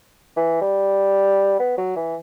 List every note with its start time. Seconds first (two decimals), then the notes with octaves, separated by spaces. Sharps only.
0.37 E3
0.61 G3
1.59 B3
1.78 F#3
1.96 E3